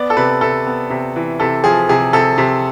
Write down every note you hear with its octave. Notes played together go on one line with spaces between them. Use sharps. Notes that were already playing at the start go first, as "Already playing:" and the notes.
Already playing: B3 D5
A4
C3 B4
C3 A4
B3
C3
E3
C3 A4
F3 G#4
C3 G#4
C3 A4
C3